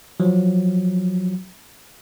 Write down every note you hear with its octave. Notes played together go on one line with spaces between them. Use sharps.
F3 F#3